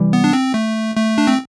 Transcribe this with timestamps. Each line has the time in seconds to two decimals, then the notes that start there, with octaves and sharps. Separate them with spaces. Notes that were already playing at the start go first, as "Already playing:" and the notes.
Already playing: C3 E3 G3
0.13 B3
0.24 D4
0.33 C4
0.54 A3
0.96 A3
1.18 D4
1.27 C4